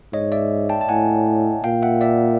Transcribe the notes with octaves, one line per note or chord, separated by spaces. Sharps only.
G#2 C#5 D#5
D5 E5
G5 A5
A5
A2 F#5 G#5
A#2 F5 G5
E5 F#5
D5 E5